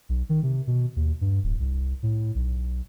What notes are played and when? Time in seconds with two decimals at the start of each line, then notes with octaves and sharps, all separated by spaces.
0.09 B1
0.29 D#3
0.43 C3
0.67 B2
0.96 D#2
1.21 G2
1.44 D1
1.60 C2
2.03 A2
2.35 B1